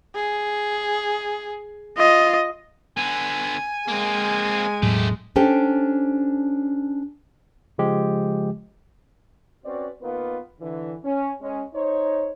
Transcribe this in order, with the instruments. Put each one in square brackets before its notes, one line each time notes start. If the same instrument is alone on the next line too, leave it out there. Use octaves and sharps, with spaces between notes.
[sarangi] G#4
[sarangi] F4 [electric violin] D#5
[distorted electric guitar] D3 B3 [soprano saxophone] G#5
[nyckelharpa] G#3 [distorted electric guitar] A#3 C4
[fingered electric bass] E1 A2 F#3 [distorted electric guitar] A3 G4
[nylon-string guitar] C#4 D4 G4 A4 C5 G5
[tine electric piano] C#3 F3 G#3 G4
[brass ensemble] C4 C#4 F#4 B4 D5
D#3 A#3 B3 F4 B4
D3 E3
C#4
G#3 C#4
D#4 C5 C#5